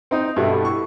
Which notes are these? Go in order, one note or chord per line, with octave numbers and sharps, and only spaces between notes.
C4 D#4
G2 B2 E4 G4 A4
C#6